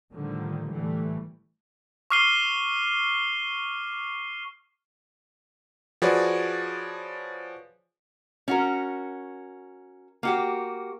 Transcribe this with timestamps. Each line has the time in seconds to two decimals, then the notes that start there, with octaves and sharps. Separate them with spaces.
0.12 A2 D3 D#3 F3 G3
0.70 A2 E3 G3 A3
2.10 C#6 D6 F6 C7 D#7 G7
6.02 F3 F#4 G#4 B4 C#5 D5
8.48 C#4 F#4 A#4
10.23 A#3 F#4 G4